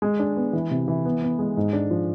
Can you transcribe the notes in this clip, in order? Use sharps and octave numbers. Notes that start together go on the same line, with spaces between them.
G#3
D4
B3
E3
C3
E3
B3
B3
G#3
G#2
D4
F3